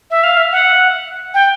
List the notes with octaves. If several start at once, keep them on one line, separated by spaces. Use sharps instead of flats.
E5
F5
E5
F#5
G5